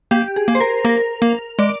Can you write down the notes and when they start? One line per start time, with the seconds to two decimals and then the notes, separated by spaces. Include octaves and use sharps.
0.11 A#3 G4
0.36 G#4
0.48 A#3
0.55 C5
0.60 A#4
0.85 A#3 A#4
1.22 A#3
1.59 G#3 D5